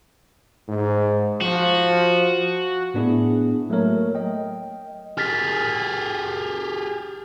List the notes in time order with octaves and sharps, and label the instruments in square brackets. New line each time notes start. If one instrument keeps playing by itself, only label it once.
[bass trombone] G#2
[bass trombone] F3 [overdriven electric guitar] F#4
[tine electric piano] A2 B3 D4 E4 G#4
F#3 A3 A#3 A#4 C#5
D#5 G5
[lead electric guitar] G4 G#4 [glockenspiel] F6 A6 B6